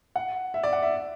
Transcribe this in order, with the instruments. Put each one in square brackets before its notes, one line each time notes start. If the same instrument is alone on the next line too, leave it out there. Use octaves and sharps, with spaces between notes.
[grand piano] F#5
E5
D5
F#5
E5